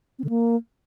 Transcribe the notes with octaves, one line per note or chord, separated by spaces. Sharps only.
C4
D3
A#3